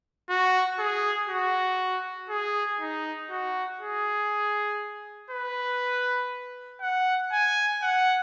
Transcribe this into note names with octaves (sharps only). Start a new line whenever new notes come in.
F#4
G#4
F#4
G#4
D#4
F#4
G#4
B4
F#5
G#5
F#5